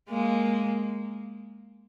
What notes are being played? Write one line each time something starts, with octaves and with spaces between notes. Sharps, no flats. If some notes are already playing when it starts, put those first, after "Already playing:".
G#3 A#3